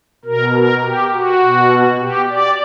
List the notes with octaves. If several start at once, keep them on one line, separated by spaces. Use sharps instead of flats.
B2 A#4
A#4
G4
F#4
B2
G4
D5